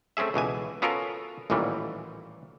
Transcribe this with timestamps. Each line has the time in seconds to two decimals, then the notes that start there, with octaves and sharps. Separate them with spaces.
0.17 A3 C4 C#4 G#4 E5
0.34 C#2 B2 E3 G#5
0.82 B3 C#4 F4 F#4 A4 A#4
1.50 A1 D#2 A#2 E3 F#3 G3